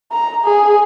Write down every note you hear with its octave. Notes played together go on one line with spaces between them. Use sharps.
A#5
G#4